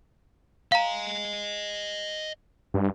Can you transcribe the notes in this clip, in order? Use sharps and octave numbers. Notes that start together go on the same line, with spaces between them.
D#5 F5 G#5 A#5
G2